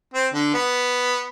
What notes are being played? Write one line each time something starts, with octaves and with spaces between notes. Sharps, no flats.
C4
D3
B3